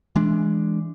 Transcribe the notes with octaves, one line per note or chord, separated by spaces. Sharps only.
E3 G#3 D4